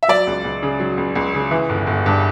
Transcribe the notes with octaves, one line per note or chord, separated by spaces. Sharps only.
E5
F#3 D5
C#2
C#2
C#3
F#3
C#2
C#2
C#3
E3
G1
G1
G2